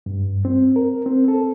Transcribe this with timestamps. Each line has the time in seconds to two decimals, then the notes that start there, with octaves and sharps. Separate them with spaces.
0.06 G2
0.45 C4
0.76 A#4
1.06 C4
1.28 A4